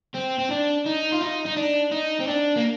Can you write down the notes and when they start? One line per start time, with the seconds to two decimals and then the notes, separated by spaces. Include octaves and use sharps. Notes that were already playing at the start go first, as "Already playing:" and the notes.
0.15 C4
0.39 C4
0.51 D4
0.86 D#4
1.12 F4
1.21 D#4
1.46 D#4
1.56 D4
1.91 D#4
2.20 C4
2.27 D4
2.56 A#3